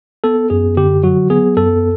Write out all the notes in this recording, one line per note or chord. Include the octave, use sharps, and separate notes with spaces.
B3 A4
F#2 G#4
D3 G4
F#3 F#4
B3 G#4
F#2 A4